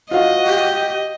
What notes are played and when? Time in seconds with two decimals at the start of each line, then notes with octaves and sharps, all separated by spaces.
0.11 F4 F#4 C5 D#5 F5
0.46 G4